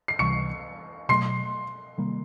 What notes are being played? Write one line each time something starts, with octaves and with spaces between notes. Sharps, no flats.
C7
C#2 C3 E3 G3 C#6 C#7
B2 F#3 A3 C6 C7
C3 D#3 G3 A#3